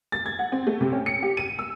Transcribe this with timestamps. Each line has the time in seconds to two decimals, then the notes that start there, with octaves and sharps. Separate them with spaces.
0.12 A6
0.26 G#6
0.39 F#5
0.52 C4
0.67 A3
0.81 C3
0.92 C#4
1.06 C#7
1.22 G4
1.37 D#7
1.59 E6